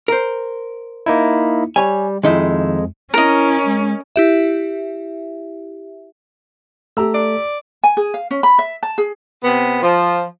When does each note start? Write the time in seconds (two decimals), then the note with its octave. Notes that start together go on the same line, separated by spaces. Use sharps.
0.08 A#4 C5
1.06 A#3 D#4 E4
1.76 G3 C#5 G#5
2.23 F2 D#3 G#3 D#4 E4
3.14 C#4 E4 A#4 D#5
3.65 G#3
4.16 E4 G4 E5
6.97 A3 G4 A4 A#5 E6
7.14 D5
7.84 G#5
7.97 G#4
8.14 F5
8.31 C#4
8.43 B5
8.58 E5
8.83 A5
8.98 G#4
9.44 C3 B3
9.83 F3